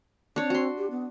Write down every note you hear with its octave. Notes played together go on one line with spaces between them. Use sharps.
C4 D4 C#5
F#4 C6
G4
B3